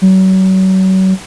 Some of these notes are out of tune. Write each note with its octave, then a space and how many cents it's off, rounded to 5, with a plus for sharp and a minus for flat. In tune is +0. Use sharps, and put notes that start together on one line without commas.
F#3 +35